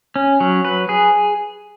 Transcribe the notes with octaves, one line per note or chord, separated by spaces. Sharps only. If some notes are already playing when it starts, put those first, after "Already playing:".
C#4
F#3
B4
G#4